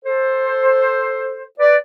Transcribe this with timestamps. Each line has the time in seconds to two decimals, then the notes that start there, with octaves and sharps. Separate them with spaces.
0.03 A4 C5
1.58 B4 D5